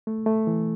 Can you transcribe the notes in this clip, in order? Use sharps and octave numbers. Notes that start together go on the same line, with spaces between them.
A3
A3
E3